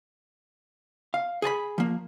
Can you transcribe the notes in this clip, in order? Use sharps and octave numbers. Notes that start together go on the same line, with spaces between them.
F5
G#4 G#5 A5 B5
F3 A#3